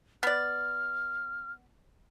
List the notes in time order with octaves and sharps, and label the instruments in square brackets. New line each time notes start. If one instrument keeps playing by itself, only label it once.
[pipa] B3 D5 [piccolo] F6